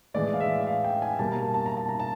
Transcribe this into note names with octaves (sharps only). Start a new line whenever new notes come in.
A2 E3 G#3 D5
F5
E5
F5
G5
G#5
B2 G3 A#3 A5
A#5
A5
A5
A#5
A5
A#5
A5